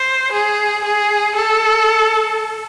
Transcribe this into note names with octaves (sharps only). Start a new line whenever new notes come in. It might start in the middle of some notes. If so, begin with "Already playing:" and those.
Already playing: C5
G#4
G#4
A4